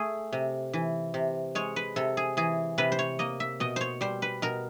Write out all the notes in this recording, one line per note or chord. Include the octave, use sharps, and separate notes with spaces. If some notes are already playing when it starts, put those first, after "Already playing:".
Already playing: A3 G#4
C3
E3
C3
G#3 C#5
B4
C3 A4
G#4
E3 G#4
C3 B4
C5
C#5
A#3 D#5
E5
B2 D#5
C5 C#5
G3 C5
B4
B2 A#4